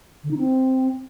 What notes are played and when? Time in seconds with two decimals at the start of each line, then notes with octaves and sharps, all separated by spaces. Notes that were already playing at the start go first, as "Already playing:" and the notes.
0.24 D3
0.31 D#4
0.38 C4